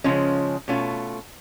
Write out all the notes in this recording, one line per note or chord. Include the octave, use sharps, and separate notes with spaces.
C#3 F3 G#3 C#4
B2 A3 C#4 F4